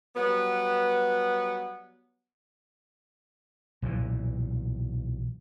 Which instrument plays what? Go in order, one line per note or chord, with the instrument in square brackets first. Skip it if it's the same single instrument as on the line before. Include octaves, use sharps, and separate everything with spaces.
[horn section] F#3 G3 B3
[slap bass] B1 A#2 C#3 E3